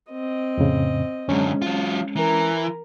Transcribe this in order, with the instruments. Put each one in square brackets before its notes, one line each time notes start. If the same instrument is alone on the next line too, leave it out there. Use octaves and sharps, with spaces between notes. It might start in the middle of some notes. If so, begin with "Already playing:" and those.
[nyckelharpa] C4 D#5
[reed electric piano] F2 A2 C#3
[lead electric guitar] F#2 D3 [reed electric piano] G#3 C#4
[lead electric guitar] F#3 F4
[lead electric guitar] E3 [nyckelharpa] A#4 A#5